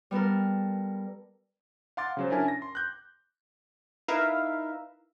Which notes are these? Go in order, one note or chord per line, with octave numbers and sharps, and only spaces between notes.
G3 B3 A4 A#4
F5 F#5 C6 D6 A6
C#3 F#3 C5
C#4 D4 E4 A#4 G#5 A5
A#6
C6
F#6 G6
D#4 E4 A#4 B4 E5 F5